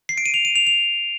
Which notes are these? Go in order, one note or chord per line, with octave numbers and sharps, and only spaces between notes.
C7
D7
D#7
F7
D#7
F7
F7